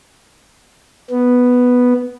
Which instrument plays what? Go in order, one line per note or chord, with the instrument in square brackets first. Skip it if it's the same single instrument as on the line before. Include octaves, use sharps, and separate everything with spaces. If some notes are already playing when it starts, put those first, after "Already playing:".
[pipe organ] B3